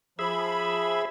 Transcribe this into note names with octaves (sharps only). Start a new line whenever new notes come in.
F3 G#4 E5 B5